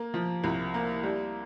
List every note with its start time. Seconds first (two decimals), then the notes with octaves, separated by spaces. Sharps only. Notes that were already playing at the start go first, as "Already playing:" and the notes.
Already playing: A#3
0.14 F3
0.44 C2
0.74 A#3
1.03 G3